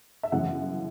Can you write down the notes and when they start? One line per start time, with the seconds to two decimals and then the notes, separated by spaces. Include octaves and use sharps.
0.23 E5
0.32 G1 F#2 C#3 E3 F#5